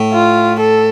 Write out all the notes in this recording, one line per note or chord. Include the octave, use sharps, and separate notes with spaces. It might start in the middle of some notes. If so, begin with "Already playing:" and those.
Already playing: A2
F4
A4